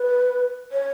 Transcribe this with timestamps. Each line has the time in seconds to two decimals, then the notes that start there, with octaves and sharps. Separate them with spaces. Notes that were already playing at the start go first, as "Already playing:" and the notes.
Already playing: B4
0.72 C#5